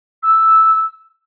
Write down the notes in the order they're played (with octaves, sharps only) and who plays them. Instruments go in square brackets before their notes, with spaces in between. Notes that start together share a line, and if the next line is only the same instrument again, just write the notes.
[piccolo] E6